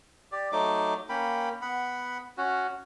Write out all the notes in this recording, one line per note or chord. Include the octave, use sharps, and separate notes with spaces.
G4 D5
F#3 A3 D#4 D6
A#3 C#4 G5 B5
B3 F#5 B5
C#4 F#4